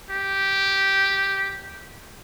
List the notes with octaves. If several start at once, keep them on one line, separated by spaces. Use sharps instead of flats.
G4